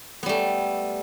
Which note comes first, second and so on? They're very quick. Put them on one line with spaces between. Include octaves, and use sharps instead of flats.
B3 G3 A3